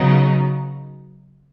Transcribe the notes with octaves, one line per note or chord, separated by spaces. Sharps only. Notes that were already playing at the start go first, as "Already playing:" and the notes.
Already playing: C#3 F#3 B3 D#4